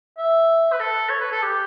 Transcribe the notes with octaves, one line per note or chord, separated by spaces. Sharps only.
E5
B4
A4
C#5
B4
A4
G4